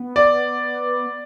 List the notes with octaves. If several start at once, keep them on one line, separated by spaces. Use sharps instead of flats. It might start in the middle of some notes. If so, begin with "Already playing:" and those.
Already playing: B3
D5